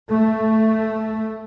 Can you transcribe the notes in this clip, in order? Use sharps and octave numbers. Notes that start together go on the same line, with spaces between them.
A3